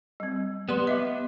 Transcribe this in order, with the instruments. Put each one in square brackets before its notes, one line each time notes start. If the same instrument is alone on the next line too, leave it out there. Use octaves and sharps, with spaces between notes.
[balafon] G3 C4
[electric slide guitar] B3 [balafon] G4 D5 C6
[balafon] D#5 E5 D6